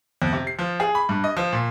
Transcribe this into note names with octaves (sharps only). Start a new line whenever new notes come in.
F2
C3
C7
F3
G#4
B5
G2
D#5
F3
A#2